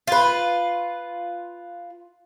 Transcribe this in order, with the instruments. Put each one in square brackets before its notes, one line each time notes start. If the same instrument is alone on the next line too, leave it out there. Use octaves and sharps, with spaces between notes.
[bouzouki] F4 B4